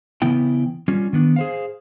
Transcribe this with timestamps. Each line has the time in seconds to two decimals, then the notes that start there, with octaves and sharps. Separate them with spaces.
0.22 C#3 E3 B3 E4 G5
0.88 G3 C#4 F4
1.13 D#3 B3 D4
1.36 G#4 C5 F5